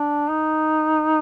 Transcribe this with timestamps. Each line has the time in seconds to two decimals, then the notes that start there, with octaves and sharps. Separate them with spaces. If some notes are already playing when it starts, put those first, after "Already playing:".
Already playing: D4
0.30 D#4